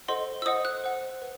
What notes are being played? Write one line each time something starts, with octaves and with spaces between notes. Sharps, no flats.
A4 C5 D#5 F#5 C6
E6
C5 D#5 F#5 D#6
F#6
C5 F#5
B4